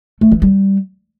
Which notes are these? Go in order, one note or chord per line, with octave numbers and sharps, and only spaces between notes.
A3
E3
G3